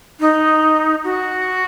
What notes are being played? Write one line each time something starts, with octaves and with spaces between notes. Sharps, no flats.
D#4
F#4